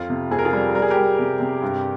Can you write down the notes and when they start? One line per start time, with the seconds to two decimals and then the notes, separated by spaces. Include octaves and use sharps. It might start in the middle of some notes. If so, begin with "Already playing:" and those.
Already playing: F2 F4
0.10 C3
0.31 F2 G#4
0.39 A#4
0.45 F4 G#4
0.53 G3
0.75 G3 A#4
0.82 G#4
0.90 G4 A#4
0.96 G3
1.19 C3
1.40 C3
1.62 G2